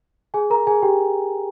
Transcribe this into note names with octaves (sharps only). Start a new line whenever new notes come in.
G#4 G#5
A#4 A#5
G#4 G#5
G4 G5